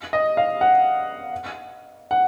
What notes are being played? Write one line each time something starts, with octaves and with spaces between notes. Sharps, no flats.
D#5
F5
F#5
F#5